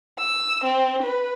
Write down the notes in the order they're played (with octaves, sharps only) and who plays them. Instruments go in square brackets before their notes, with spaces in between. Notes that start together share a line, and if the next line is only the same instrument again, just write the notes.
[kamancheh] E6
C4
B4